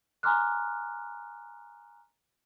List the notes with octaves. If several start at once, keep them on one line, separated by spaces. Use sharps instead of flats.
G#5 A#5 C6 D6 F6 F#6